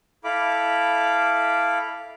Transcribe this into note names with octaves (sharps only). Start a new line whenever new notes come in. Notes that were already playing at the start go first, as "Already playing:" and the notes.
E4 A4 F5 B5 D6